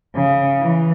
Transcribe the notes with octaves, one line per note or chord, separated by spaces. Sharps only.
C#3
E3